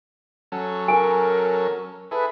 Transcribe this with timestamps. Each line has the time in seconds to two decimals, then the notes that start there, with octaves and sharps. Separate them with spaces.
0.52 F#3 C#4 A4
0.88 A#4 G#5
2.11 E4 G#4 A4 B4